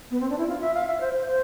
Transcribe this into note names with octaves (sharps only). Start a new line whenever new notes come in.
B3
C4
D4
E4
F4
E5
F5
E5
C5
C5
C5